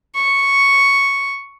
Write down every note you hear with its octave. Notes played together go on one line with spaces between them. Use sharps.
C#6